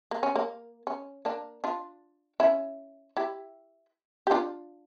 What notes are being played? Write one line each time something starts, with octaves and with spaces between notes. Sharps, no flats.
A#3
C#4
A#3
C#4
A#3 D4
D4 F4
C#4 E4
E4 G4
G4
D4 F4